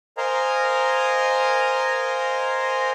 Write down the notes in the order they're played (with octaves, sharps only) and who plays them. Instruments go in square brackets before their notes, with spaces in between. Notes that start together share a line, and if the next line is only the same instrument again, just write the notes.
[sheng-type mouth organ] A#4 C5 D#5 F5 G#5 A#5